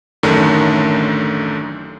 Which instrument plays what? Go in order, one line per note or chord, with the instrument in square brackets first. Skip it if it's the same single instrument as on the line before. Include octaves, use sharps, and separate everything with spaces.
[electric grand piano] A1 F#2 D3 D#3 A3